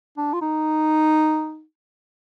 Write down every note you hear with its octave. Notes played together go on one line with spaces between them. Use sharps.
D4
F4
D#4